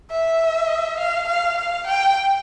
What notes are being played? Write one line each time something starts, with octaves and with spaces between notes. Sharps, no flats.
E5
F5
F5
F5
G5